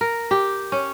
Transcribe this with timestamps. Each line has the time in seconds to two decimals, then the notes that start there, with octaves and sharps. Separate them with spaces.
0.01 A#4
0.31 G4
0.72 C#4